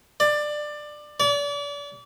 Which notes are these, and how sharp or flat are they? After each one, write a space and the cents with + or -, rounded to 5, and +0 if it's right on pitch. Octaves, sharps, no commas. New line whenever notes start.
D5 +20
D5 -35